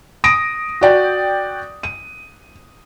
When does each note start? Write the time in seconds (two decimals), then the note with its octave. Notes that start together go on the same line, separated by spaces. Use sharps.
0.24 D#6 A#6 D7
0.81 F#4 D5 G5
1.83 D#7